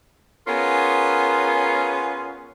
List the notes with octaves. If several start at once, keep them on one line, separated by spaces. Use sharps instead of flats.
B3 C#4 F4 G#4 A#4